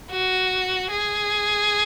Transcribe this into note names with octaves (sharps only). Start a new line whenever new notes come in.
F#4
G#4